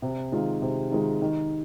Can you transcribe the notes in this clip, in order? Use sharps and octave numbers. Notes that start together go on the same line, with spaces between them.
C3
D#3 G#3 F4
C3
D#3 G#3 F4
D#3